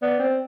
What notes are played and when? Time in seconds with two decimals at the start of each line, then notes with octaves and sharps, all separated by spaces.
0.02 B3 D5
0.19 C4